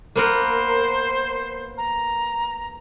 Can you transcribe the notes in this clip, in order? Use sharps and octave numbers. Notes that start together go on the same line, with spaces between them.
A#3 B3 A#4 C5
A#5